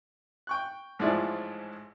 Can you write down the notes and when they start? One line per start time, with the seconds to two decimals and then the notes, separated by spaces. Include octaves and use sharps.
0.47 G5 C#6 F#6
0.99 A1 G#2 F3 G#3 E4 D5